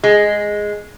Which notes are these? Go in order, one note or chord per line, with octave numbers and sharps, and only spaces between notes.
G#3